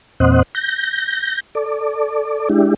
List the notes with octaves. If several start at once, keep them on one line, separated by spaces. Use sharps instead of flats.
E2 A#2 C4 C5 D#5 F#5
G6 A#6
A4 D5
G#3 D4 E4 G4